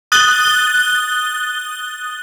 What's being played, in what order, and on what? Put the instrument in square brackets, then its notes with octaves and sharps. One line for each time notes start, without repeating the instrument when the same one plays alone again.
[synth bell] D#6 F#6 A6 G7